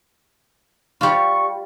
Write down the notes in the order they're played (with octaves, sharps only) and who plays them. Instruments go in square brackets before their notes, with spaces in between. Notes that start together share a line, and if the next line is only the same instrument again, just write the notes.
[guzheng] G3 F4 [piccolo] C#6